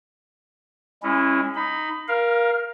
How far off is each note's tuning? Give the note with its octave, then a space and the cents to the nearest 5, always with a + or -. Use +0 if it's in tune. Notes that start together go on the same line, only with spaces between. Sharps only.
G#3 -35 C#4 -20 E4 +0
D#4 +0 B5 +20
A#4 +20 F5 -5